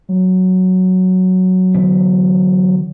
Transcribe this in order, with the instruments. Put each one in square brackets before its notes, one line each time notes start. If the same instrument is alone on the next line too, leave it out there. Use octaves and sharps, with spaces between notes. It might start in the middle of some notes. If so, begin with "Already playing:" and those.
[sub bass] F#3
[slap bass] D3 E3 B3